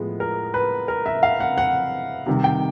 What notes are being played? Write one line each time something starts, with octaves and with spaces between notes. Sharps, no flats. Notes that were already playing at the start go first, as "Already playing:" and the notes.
Already playing: A2 F3 G#3 B3
A#4
B4
A#4
E5
F5
F#5
F#5
C3 D#3 G3
G5